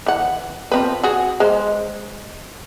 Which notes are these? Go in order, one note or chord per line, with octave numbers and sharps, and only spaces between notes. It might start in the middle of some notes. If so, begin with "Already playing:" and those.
E3 F#5
F3 C4 B4
F#4 G#4
G#3 C5